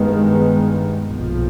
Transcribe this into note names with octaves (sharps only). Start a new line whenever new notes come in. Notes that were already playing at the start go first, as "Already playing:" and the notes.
Already playing: G2 D#3 G#3 B3
B1 A#2 F3